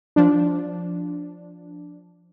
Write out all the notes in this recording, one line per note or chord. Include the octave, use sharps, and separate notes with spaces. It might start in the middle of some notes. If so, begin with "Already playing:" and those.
F3 D4